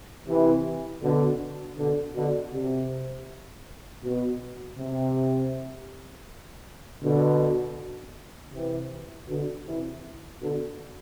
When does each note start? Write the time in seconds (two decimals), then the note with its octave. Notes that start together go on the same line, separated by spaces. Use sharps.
0.27 C3 E3
1.02 B2 D3
1.77 B2 D3
2.14 B2 D3
2.53 C3
4.03 B2
4.77 C3
7.02 B2 D3
8.52 C3 E3
9.28 B2 D3
9.65 C3 E3
10.41 B2 D3